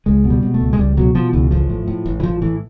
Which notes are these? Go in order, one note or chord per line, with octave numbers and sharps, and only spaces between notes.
C#2 G#3
B2
G3
B2
A3
C#2
G#3
C#2 G3
B2 F#3
B2 F3
C#2 E3
A1 F3
A2
A2
A1
E3
A1 F3
A2 E3